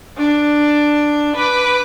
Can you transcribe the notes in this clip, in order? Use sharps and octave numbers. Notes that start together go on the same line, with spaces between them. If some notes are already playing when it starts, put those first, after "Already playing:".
D4
B4 D6